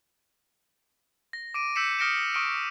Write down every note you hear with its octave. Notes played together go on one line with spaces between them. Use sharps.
A#6
D6 D7 D#7
E6 G6 B6 C#7 E7
D#6 F6 A#6 C#7 D7 E7
C#6 D#6 F6 D7